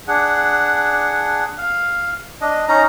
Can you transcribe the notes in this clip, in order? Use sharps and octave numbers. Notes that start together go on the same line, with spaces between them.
D4 G#4 F#5
F5
D4 D#5
C#4 D#4 A#5